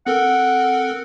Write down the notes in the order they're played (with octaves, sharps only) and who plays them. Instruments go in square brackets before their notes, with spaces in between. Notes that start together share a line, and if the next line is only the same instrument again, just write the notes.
[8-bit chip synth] C4 A4 A#4 [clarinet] F#5